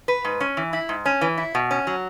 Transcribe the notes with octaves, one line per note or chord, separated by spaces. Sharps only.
B4
G#2
C#4
E3
E4
G#2
C#4
E3
E4
B2
C#4
F#3